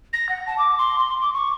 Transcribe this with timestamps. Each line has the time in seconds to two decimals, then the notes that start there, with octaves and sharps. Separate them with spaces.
0.13 A#6
0.29 F#5
0.47 A5
0.58 D6
0.78 C6
0.98 C6
1.22 D6
1.34 C#6